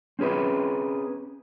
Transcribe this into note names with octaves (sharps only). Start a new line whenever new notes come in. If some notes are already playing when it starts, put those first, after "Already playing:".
C4 C#4 G#4 B4